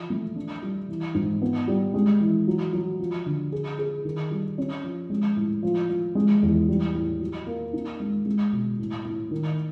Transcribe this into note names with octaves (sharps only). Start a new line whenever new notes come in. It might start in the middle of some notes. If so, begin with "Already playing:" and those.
Already playing: E3 F3
A3
D4
G3
E3
G#2
B3
G3
G#3
E3
F#3
F#3
F3
D3
G#4
G#4
D#3
G3
C#4
F3
G#3
A2
F3
F3
G#3
E2
G3
A2
F#3
A#3
D#4
G#3
G#3
B2
A2
A2
D#3